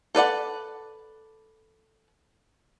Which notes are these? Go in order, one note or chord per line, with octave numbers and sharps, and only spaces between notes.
A4 B4 D5 F#5